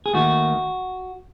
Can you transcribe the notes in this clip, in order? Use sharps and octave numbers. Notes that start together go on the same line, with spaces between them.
G#4
D#2 D#3 A3 F#4